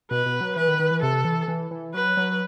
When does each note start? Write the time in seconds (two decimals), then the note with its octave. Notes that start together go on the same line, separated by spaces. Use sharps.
0.11 B2 B4
0.26 B2
0.41 F#3
0.56 E3 B4
0.68 D#3
0.79 D#3
0.91 E3
1.03 C3 A4
1.25 E3
1.48 E3
1.71 E3
1.94 F#3 B4
2.17 F#3